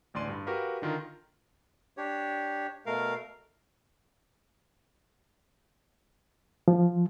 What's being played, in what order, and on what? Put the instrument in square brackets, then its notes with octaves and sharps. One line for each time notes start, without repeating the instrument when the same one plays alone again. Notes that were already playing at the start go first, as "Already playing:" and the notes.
[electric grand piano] A1 D2 D5 C6 D#7
G2
F#4 G4 A#4 B4 F5
D3 D#3 F4 A#4
[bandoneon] D4 G4 C#5
B2 A3 A#4 F5
[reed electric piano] F3